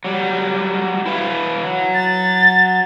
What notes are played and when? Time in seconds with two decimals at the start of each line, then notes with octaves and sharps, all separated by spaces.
0.05 F#3 G3
1.06 E4 B4 F5
1.63 F#3
1.94 A6